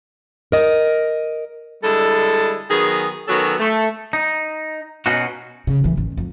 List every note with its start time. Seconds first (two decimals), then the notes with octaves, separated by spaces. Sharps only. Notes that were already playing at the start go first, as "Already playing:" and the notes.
0.52 A#4 D#5
1.83 D3 G3 G#3 E4 A4
2.70 D#3 F#3 B3 G#4
3.28 D#3 F#3 B3 C#4 F#4 A4
3.60 A3
4.13 D#4
5.06 B2 C#4 D#4 F#4
5.67 C#3
5.84 E2 E3
5.97 A1 D#3
6.17 F2